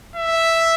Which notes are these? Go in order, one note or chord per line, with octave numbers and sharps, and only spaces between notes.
E5